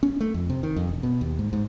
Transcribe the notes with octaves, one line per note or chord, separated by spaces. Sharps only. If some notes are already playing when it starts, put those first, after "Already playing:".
C#4
A3
F2
C3
D#3
F2
E1
B2
D#2
G#2
G#2